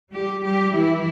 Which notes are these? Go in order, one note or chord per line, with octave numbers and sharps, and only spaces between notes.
G3 G4
G3 G4
E3 E4